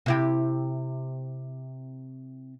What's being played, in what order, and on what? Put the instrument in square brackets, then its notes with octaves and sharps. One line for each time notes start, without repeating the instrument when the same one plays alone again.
[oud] C3 E4 G4